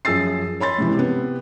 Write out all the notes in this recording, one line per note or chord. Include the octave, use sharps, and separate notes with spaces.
F#2 F3 G#4 E6 A6 C7
C#5 B5 C6 A6
G#2 C3 E3
C3 B3